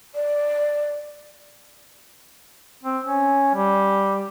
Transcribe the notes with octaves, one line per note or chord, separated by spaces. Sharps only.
D5
C4
C#4
G3